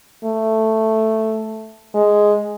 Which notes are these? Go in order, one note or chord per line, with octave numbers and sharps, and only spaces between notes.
A3
G#3